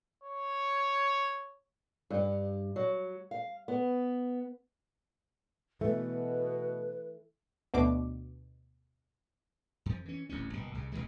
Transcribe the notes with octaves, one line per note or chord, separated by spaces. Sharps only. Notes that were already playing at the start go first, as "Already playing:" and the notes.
C#5
G2
F#3
F5
B3
B2 E3 A3 B4
D2 B2 D4 D6
F2 F3
E3 C#4
D1 A1 E2 C#4
F#1 B2
C2 C#3
D#1 D#2 E3 G#3